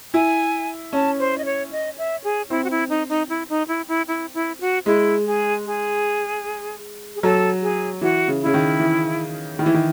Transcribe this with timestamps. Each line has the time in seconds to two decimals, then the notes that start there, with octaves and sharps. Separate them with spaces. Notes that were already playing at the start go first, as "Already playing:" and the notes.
0.14 E4 G#5
0.93 C#4 A5
1.19 C5
1.38 D#5
1.45 C#5
1.72 D#5
1.98 E5
2.24 G#4
2.50 C4 E4
2.64 F#4
2.70 E4
2.89 D#4
3.09 D#4
3.29 E4
3.49 D#4
3.68 E4
3.88 E4
4.08 E4
4.34 E4
4.60 F#4
4.86 G#3 E4
5.25 G#4
5.65 G#4
7.16 G#4
7.22 F#3 A4
7.62 G#4
8.01 E3 F#4
8.28 C#3
8.41 C#3 E4
8.54 D#3
8.80 E3
9.59 D#3 E4
9.66 E3
9.74 D#3